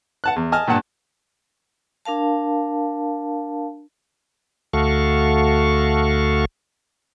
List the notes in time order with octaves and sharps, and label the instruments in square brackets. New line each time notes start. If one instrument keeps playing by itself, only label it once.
[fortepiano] F#5 A5 F#6
E2
D#5 G#5 A5 F6
G2 A#2 G3 F#5 A5
[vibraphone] D4 A#4 F5 A5
[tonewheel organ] D2 A3 F#4 A4 F5 C#6